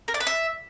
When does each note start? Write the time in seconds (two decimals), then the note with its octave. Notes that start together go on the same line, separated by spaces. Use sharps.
0.08 A#4
0.14 D5
0.20 B4
0.27 E5